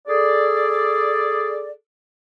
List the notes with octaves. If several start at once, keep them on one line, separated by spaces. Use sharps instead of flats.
G#4 A4 D5